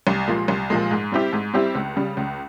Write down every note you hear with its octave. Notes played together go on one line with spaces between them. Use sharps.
C2
A#2 F3 G#3
C2
A#2 F3 G#3
G#2
G3 C4 E4 G4
G#2
G3 C4 E4 G4
C#2
C#3 G3
C#2